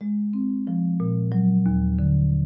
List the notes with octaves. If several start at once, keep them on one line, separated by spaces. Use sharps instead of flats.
G#3
C4
F3
A#2
F#3
D#2
D3